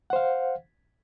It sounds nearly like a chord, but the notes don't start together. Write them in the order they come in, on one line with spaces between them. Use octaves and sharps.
F#5 C5 F5